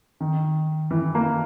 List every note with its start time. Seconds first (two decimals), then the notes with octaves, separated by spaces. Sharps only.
0.20 D#3
0.91 E3
1.15 A#3